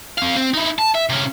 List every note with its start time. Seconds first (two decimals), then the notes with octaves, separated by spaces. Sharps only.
0.18 C4 F5
0.36 C4
0.54 D#4 E4
0.78 A5
0.95 E5
1.09 C3 C#4